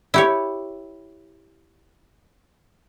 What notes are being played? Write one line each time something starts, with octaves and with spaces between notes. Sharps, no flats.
E4 G4 C#5